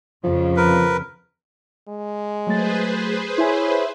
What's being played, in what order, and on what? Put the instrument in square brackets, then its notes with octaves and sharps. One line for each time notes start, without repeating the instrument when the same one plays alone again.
[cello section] F2 C#3 [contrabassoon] F3
[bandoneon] A#4 B4
[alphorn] G#3
[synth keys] F#3 A3 A6 [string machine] G#4 B4 C5
[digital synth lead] E4 [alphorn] C#5 [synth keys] G#5 C6